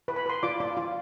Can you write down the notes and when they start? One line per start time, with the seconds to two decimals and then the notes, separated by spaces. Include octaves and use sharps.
0.08 B4
0.16 B5
0.26 B4 C6
0.43 F4 D5 D6
0.60 F4 D5 D6
0.77 F4